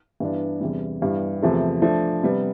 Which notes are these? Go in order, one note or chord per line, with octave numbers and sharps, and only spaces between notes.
G2 E3 B3 D4
E2 C3 G3
G2 E3 G3 B3
E2 C3 F3 A3
F3 A3 D4
C3 G3 B3